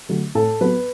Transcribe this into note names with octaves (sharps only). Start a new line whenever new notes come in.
D3 F#3 A3
A2 A4
F#3 B3 B4